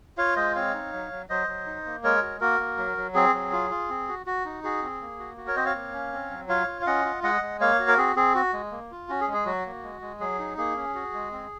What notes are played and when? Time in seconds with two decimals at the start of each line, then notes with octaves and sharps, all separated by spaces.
0.17 F4 C#5 F5
0.36 G#3 C5 D#5
0.55 C4 C#5 F5
0.74 D#4
0.93 F#3
1.11 F#3
1.29 F#3 C5 D#5
1.48 F#3
1.66 D#4
1.86 A#3
2.04 G#3 A#4 C#5
2.22 F#4
2.40 A#3 F#4 A#4
2.60 A#3
2.78 F#3
2.97 F#3
3.14 C4 G#4
3.33 F#3
3.52 F4
3.71 F4
3.89 C4
4.08 F#4
4.26 F#4
4.45 D#4
4.64 F#4 G#4
4.82 C4
5.01 A#3
5.19 F#4
5.37 F#4
5.47 A#4 C#5
5.56 C4 C5 D#5
5.65 C#5 F5
5.74 A#3
5.93 C#4
6.13 C4
6.31 F#3
6.49 F4 C#5 F5
6.67 F4
6.82 F5
6.87 C#4 D#5 F#5
7.05 F4
7.23 G#3 D#5 F#5
7.41 G#3
7.60 A#3 C#5 F5
7.79 F#4
7.88 A#4
7.98 C4 G#4
8.16 C4 G#4
8.35 F#4
8.53 G#3
8.71 A#3
8.91 F4
9.09 C#4 F#4
9.21 G#4
9.27 G#3
9.33 G#4
9.46 F#3 F#4
9.65 A#3
9.83 G#3
10.01 G#3
10.20 F#3 G#4
10.39 D#4
10.58 A#3 G#4
10.76 C#4
10.95 F#4
11.13 G#3
11.32 C4